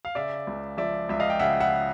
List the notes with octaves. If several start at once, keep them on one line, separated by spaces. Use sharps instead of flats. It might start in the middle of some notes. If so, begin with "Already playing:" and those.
F5
C#3 D5 E5
C#2
F3 D5 E5
C#2 E5
D#5 F5
G5
C#3 E5 F#5
E5 F#5